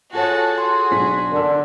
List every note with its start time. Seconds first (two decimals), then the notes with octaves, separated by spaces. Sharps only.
0.13 F4 F#4 G#4 A4 C#5 A5
0.58 F#4 G#4 C6
0.91 B1 D4 B6
1.31 D3 A#4 D5 E6